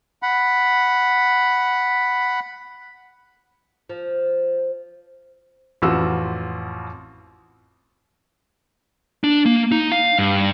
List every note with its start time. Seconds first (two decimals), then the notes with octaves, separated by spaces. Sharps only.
0.23 F#5 B5
3.89 F3
5.82 A1 F2 F4 F#4 E6
9.24 D4
9.46 A#3
9.72 D#4
9.92 F5
10.19 G2